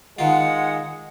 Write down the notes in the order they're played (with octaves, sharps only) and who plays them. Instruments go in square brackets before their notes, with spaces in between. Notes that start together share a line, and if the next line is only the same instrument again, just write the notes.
[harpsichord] D#3 F4 [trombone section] G#3 [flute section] F#5